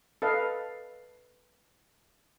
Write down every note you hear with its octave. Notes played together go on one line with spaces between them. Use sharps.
A4 B4 D#5 F5